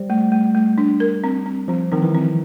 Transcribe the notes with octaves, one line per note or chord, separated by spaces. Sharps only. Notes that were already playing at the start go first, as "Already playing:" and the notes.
Already playing: G3 C5
A3
A3
A3
D4
A#4
C4
C4
F3 C4
D#3 C4
E3
C4